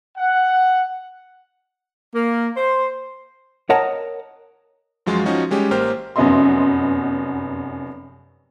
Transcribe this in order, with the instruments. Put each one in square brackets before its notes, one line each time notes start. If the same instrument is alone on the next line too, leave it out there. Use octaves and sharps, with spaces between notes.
[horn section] F#5
A#3
C5
[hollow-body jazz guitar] A#4 C#5 D#5 F#5 A5 A#5
[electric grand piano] F#2 F3 F#3 G#3 F4 C6
F3 C#4 D#4 F#4
G3 G#3 C#4 G4
A1 A#3 G4 C5 F6
[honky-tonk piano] F1 F#2 B3 D#5 E5 C6